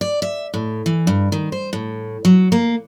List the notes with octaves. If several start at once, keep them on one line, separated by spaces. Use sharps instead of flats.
D5
E5
A2
E3
G2
D#3
C5
A2
F#3
A#3